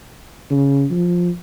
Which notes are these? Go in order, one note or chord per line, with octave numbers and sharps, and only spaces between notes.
C#3
F3